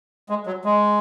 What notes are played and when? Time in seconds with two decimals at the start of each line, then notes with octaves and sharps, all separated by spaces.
0.29 G#3
0.47 F#3
0.65 G#3